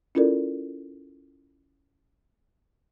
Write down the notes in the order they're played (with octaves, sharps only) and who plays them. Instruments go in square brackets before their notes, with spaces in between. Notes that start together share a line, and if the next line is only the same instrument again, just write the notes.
[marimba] C#4 E4 F4 A4 A#4 D5